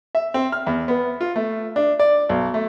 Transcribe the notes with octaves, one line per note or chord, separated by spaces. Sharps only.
E5
C4
F6
E2
B3
F4
A3
D4
D5
B1
A3